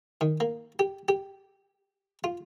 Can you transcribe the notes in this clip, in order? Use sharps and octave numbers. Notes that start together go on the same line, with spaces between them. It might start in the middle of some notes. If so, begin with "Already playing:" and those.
D#3
A#3
G4
G4
F4